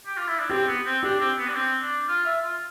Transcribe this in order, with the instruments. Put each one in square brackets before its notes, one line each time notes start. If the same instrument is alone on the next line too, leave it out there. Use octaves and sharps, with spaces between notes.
[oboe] G4
F4
E4
D4
[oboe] C4 [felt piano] G4
[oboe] B3
C4
[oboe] D4 [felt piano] G4
[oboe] C4
B3
D4
C4
D4
F4
E5
F4